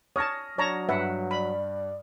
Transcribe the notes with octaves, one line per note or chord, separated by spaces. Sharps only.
C#5 A5 D#6 F6 A#6
F#3 D4 C#5 A5 A#5
G2 B4 E5 F#5
D5 B5